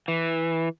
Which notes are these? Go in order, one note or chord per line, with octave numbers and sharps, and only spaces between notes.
E3